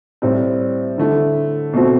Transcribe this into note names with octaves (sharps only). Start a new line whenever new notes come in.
A2 G3 C4
D3 A3 E4
B2 A3 C4 F#4